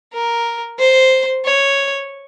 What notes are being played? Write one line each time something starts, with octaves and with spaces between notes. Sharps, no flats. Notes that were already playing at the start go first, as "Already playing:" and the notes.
A#4
C5
C#5